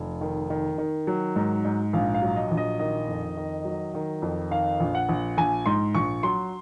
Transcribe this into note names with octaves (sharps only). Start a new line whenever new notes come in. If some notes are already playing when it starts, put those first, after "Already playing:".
Already playing: F1
D#3
D#3
D#3
F#3
G#2
G#2
A#1 F5
F5
F#3
D#5
A#1
D#5
D#3 D#5
F2
D#3
F#3
D#3
F2
D#3 F5
A#1
F#5
A#1
A#1 G#5
G#2 C6
A#1 C#6
F#3 C6